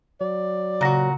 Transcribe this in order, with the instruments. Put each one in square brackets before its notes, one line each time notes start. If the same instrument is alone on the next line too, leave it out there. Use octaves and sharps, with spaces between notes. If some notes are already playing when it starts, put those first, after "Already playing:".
[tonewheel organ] F#3 [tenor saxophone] D5
[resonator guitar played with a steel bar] A#2 F#4 [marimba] C#3 A#6